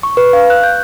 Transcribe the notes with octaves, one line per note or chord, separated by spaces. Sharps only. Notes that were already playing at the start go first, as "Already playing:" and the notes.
C#6
B4
F5
F#6
G6